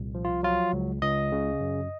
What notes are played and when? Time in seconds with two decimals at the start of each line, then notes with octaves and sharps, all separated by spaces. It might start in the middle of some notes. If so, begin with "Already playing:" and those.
Already playing: C2 A#2
0.15 F3
0.25 F4
0.43 F#3 F4
0.73 C#2
1.02 C#2 D#5
1.32 C#3
1.61 F#2